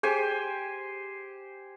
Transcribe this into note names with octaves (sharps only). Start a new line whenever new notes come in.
G4 G#4 C5 G#5